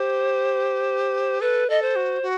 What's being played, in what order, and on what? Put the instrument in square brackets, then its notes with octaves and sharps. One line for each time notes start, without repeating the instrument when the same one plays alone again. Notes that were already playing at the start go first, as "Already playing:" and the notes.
Already playing: [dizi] G4 [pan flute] C5
[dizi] A4 [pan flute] B4
[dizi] A4 [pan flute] D#5
[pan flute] C5
[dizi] F#4
F#4